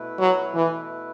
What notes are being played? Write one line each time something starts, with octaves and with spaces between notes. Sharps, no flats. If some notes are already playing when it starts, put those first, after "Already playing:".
Already playing: B2 A3 E4 B4
F#3
E3